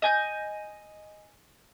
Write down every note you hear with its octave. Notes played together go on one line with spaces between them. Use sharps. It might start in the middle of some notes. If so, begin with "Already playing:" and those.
D#5 G#5 G6